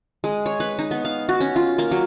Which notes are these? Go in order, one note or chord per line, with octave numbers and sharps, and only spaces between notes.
G#3
C#5
B4
D#4
B3
F5
F#4
C#4
F4
A#3
F#3